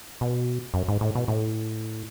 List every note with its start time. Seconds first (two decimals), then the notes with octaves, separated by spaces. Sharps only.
0.21 B2
0.74 F#2
0.88 G#2
1.01 A2
1.15 B2
1.28 A2